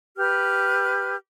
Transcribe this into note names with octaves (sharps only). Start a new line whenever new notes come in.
G4 B4 F6